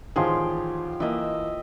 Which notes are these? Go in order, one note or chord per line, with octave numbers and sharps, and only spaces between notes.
A1 D#3 F3 G4 G#4 G5
E3 A#3 D#5 E5